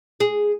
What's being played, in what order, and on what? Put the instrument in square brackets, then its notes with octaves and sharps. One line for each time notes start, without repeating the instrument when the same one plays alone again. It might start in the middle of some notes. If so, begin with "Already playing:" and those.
[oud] G#4